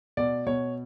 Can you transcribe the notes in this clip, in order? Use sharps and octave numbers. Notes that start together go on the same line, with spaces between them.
B2 D5
B2 C#5